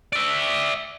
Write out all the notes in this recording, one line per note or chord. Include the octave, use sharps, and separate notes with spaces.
D5 E5